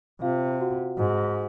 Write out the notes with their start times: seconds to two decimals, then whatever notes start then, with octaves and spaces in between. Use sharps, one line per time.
0.22 C3 F4 F5
0.60 F#4 F#5
0.97 G#2 F#4 F#5